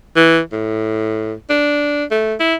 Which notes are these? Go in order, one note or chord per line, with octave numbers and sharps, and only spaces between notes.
E3
A2
D4
A3
E4